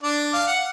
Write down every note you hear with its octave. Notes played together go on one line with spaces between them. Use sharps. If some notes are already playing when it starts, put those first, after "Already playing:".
D4 D5
F5
F#5